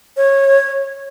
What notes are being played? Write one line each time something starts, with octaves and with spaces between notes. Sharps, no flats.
C#5